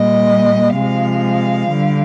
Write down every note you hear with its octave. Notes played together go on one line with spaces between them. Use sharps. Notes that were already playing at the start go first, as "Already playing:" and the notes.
Already playing: A#2 G3 D#5
C3 F3 G#3 F5
D3 G3